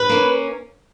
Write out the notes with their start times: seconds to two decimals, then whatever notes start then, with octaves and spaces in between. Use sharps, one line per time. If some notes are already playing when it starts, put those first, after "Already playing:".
Already playing: B4
0.09 A#3 C#4